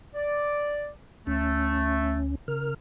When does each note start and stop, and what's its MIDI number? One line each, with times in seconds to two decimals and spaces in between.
0.15 0.87 74
1.27 2.35 38
1.27 2.19 57
1.27 2.35 61
2.48 2.74 49
2.48 2.74 70
2.48 2.74 89